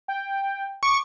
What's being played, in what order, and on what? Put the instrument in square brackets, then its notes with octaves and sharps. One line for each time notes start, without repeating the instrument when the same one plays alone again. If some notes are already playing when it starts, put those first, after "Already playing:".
[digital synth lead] G5
[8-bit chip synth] C#6 [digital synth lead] D6